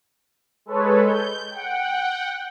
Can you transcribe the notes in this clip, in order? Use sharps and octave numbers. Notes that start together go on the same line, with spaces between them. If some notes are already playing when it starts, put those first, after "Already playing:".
G#3 A4 B4 C#5
G6
F#5 G5